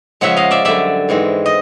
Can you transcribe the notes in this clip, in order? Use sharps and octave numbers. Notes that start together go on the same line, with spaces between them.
C#3 F3 G#3 C#4 E5 F#5
D#5 F5
D5 E5
F#2 D3 G3 D5 E5
G#2 E3 G#3 C4
D#5